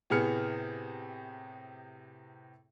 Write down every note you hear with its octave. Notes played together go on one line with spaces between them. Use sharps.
A2 C3 B3 G#4 F6 C#7